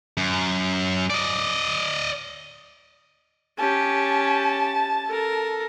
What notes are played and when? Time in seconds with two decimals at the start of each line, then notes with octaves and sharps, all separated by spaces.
0.17 F#2
1.10 D5 D#5
3.58 C#4 G4 A5
5.06 A4 A#4